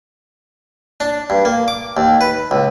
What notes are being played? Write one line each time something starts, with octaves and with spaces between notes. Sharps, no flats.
D4
G2
A#3
D6
D#2
B4
C#2